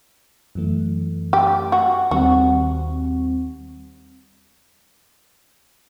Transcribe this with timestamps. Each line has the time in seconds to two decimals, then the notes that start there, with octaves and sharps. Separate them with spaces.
0.55 F#2 E3 A3
1.33 G4
1.72 F#4
2.11 D#2 D#3 G3 C4 F#4